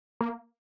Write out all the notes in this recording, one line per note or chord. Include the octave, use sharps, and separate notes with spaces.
A#3